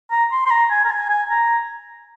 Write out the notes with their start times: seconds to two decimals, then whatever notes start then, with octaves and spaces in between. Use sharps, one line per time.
0.11 A#5
0.32 C6
0.46 C6
0.51 A#5
0.71 G#5
0.85 A#5
0.91 G#5
1.09 G#5
1.30 A#5